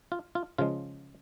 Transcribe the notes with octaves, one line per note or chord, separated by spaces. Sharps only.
F4
F4
C#3 F3 G#3 F4